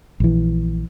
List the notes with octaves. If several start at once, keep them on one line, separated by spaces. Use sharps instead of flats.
A#1 E3